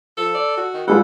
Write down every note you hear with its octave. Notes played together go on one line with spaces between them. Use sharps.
F3 A4
D5
F#4
D#3
G3 G#3 F4 A4 F#5